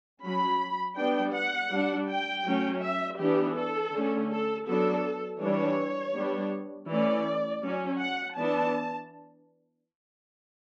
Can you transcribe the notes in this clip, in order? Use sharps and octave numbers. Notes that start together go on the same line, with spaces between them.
F#3 C#4 B5
G3 B3 D4 G5
F#5
G3 D4
G5
F#3 A3 C#4
E5
E3 B3 D4 G4
A4
D3 A3 C#4
A4
F#3 B3 D4 A4
E3 G3 D4 C#5
G3 B3 D4
E3 A3 C#4 D5
F#3 C#4
F#5
E3 B3 D4 A5